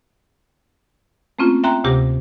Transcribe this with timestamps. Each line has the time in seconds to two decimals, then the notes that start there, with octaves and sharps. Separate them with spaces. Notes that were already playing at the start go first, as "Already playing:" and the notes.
1.39 A3 A#3 C4 C#4 F4
1.64 E5 G5 A#5 C6 F#6
1.84 D2 C3 G4 D6 A#6